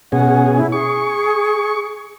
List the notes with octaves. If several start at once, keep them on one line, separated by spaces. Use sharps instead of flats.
B2 C#4 G#4 F#5
E4
G#4 C#6